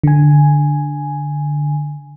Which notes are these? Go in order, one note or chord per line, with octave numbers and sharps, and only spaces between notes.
D3 G#5